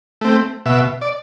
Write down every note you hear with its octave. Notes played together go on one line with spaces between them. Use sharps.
A3 C4
B2 E5
D5